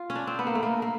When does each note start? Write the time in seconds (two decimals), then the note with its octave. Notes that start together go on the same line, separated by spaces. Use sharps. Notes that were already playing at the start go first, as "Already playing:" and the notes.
Already playing: F4
0.10 C#4
0.15 D4
0.27 C4
0.39 B3
0.47 A#3
0.55 A3
0.63 A#3
0.82 A#3